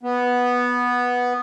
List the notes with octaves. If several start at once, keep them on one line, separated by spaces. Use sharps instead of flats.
B3